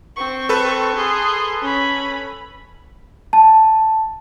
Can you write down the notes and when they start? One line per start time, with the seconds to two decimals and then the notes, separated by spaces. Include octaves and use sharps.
0.16 C4 C#6
0.49 A4 B4
0.95 G#4 C6
1.62 C#4 B5
3.33 A5